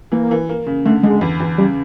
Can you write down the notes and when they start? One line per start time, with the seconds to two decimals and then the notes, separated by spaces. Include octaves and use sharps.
0.12 E3 A#3
0.31 E3
0.49 A#3
0.66 C#3
0.85 D3 A3
1.03 D3 G#3
1.21 E2
1.40 E2
1.58 C#3 G3